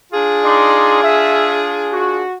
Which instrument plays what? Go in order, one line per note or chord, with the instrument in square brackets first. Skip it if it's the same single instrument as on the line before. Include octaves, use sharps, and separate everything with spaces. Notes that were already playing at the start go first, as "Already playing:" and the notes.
[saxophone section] D4 F4 G#4
[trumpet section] D#4 D5 C6
E5
F#4